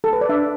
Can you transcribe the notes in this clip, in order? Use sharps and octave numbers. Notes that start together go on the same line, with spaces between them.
A4
B4
D5
D4 E5